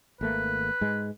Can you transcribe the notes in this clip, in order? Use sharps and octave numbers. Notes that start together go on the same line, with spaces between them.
G#1 A3 A#3 B4
G#2 G#3